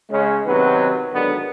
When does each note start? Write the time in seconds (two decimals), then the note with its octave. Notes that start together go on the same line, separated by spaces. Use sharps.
0.11 C#3 G#3 C#4
0.46 C3 D#3 F#3 B3 B4
1.13 G#2 D3 D#3 F#3 B3